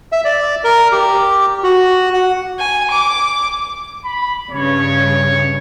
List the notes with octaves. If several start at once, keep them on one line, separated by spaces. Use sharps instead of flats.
E5
D5
A#4
G4
F#4
F#5
G#5
D6
B5
G2 C#3 C#5